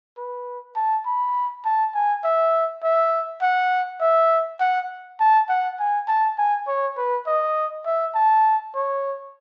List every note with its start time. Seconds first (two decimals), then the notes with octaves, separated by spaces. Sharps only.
0.17 B4
0.76 A5
1.06 B5
1.65 A5
1.94 G#5
2.24 E5
2.83 E5
3.41 F#5
4.01 E5
4.60 F#5
5.20 A5
5.49 F#5
5.79 G#5
6.08 A5
6.38 G#5
6.67 C#5
6.97 B4
7.27 D#5
7.86 E5
8.15 A5
8.75 C#5